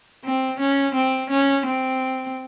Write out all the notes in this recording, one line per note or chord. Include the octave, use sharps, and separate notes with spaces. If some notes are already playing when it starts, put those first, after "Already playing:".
C4
C#4
C4
C#4
C4